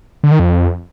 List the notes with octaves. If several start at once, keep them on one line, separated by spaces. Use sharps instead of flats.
D3
D#3
F2